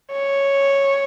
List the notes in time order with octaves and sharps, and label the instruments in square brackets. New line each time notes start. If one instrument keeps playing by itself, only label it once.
[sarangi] C#5